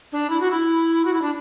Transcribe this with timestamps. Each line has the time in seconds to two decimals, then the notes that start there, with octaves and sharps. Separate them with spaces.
0.12 D4
0.30 E4
0.40 F#4
0.50 E4
1.05 F#4
1.13 E4
1.22 D4